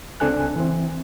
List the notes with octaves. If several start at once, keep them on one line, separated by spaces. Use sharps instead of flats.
C#2 C4 D4 A4 G#5 F#6
E3 C4